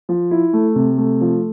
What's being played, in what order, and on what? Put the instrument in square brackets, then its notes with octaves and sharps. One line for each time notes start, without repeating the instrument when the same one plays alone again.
[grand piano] F3
E4
A3
C3
A3
F3